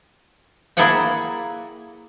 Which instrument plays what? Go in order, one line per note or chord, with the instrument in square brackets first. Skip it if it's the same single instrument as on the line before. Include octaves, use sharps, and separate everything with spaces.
[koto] A#3 E4 G#4 A4 F#5 G5